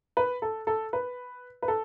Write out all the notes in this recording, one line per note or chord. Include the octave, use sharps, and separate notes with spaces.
B4
A4
A4
B4
B4
A4